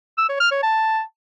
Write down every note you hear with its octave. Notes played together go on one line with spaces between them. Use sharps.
E6
C#5
F6
C#5
A5